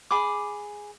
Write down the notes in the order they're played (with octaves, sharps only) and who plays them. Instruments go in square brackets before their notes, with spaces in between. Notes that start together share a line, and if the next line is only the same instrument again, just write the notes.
[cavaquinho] G#4 B5 D6